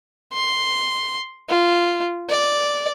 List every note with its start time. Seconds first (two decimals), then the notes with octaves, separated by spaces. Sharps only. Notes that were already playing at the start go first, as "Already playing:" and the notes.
0.33 C6
1.50 F4
2.30 D5